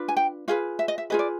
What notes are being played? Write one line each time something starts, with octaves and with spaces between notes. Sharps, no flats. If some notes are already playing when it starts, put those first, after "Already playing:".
Already playing: D4 F4 B4
G#5
G5
F4 G#4 B4 F5
E5
D#5
E5
F4 G#4 B4 D#5
D5